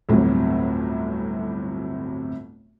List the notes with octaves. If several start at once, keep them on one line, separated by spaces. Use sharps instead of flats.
G1 D2 A2 C3 F#3